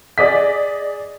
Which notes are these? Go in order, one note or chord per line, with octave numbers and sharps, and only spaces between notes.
G#4 D5 D#5 B6